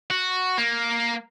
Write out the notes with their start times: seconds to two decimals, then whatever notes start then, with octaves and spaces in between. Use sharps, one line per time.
0.10 F#4
0.58 A#3